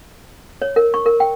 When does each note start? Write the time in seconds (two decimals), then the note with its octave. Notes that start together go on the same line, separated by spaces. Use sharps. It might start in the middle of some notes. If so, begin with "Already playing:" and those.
0.62 C#5
0.76 A#4
0.94 C#6
1.06 A#4
1.20 G5